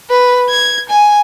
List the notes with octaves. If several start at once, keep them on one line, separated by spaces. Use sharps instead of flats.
B4
G#6
G#5